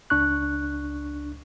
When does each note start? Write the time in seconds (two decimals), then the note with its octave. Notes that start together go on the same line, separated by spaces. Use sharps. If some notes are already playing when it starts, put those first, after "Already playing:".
0.10 C#2 D4 C#6 F#6